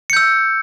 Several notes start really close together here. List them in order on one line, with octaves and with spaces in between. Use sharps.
C#7 G6 E6